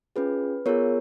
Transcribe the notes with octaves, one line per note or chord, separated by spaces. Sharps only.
C#4 F4 G#4 B4
B3 F4 G#4 A#4 C#5